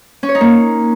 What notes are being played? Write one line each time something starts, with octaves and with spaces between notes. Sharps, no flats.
C#4
C#5
D#4
A#3